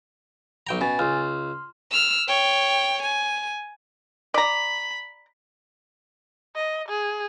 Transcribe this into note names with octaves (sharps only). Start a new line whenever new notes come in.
B1 G5 A#5
B2 C#4 G#5 A6
C#2 C6 F6
E6 F6
C#5 G5
G#5
D5 A#5 B5
D#5
G#4